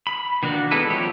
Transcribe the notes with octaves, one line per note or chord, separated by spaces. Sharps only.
B5
D#3 A#3 D4 F#4
G#3 B3 E4 A4 B4
F3 G3 C4 G4 C#5